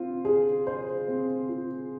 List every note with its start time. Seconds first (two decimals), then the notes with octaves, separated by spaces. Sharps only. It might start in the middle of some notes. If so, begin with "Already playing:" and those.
Already playing: C4 F4
0.25 G#4
0.67 C5
1.08 C4
1.49 F4